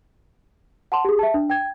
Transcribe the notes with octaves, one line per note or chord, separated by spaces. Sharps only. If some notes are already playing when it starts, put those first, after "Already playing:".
F#5 A5 C6
G4 G#4
E5 A5
D4
G5 G#6